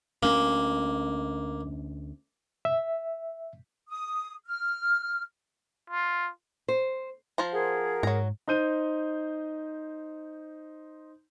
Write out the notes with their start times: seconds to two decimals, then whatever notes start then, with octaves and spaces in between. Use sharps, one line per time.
0.23 D2 A#3 C#4
2.65 E5
3.89 D#6
4.46 F6
5.90 F4
6.68 C5
7.38 F3 C5 A#5
7.52 G#4 A#4 F#5
8.03 G#2 F#3 A#5
8.48 D#4 C5 G6 D#7